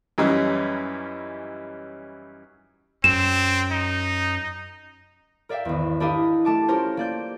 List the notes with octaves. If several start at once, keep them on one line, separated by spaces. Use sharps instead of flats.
F#2 E3 G3 C#4 D#4
F#2 C4 E7
D#4
A#4 D5 E5 F5 G5
G#1 E2
D4 E4 G4 A#4 D#5 F5
A3 A5 D6
C#4 F4 G4 A#4 C5
A#3 D5 G6